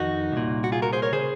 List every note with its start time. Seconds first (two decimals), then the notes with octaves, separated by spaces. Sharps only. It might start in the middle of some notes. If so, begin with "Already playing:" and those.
Already playing: F2 D#3 D#4 F#4
0.32 C2 A#2
0.64 F#4
0.72 F4 G#4
0.82 F#4 A#4
0.93 G#4 C5
1.02 A#4 C#5
1.12 C#3 G#4 C5